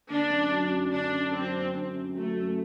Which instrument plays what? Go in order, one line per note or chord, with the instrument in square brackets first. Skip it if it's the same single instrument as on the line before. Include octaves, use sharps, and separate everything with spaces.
[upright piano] D3 [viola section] D4
[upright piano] F#2
F#3
F#2
[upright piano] D3 [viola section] D4
[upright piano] F#2
[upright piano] F#3 [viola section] C4
[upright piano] F#2
D3
F#2
[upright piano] F#3 [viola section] A3
[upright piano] F#2